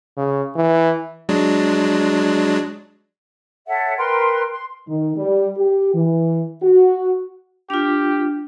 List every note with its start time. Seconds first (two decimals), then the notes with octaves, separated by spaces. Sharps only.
0.17 C#3
0.56 E3
1.29 F#3 G#3 D4
3.67 A4 C#5 E5 F#5
3.97 A#4 B4 G5 C6
4.50 C6
4.87 D#3
5.16 G3
5.57 G4
5.94 E3
6.62 F#4
7.70 D4 F4 G4